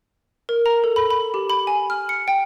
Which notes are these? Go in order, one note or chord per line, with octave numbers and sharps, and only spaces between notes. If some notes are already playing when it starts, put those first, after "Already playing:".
A#4
A#5
A4
B5
B5
G4
B5
G#5
F6
C#7
G5